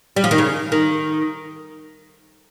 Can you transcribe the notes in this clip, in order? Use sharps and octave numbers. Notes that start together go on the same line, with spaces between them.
G3
F3
D#3
C#3
D#3